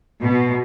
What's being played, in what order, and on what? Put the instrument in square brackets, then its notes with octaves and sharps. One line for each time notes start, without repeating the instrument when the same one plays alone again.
[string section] B2